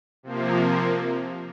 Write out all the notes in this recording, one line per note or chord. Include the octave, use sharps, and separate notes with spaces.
C3 F3 A#3